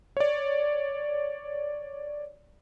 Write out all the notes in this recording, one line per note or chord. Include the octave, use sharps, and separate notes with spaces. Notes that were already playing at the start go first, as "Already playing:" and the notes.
C#5 D5